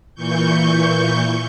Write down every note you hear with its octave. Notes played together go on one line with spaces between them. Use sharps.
A#2 E3 C#6 G6